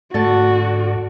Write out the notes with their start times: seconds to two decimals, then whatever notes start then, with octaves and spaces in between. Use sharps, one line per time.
0.14 G#2 D3 A3 F#4 D5 A5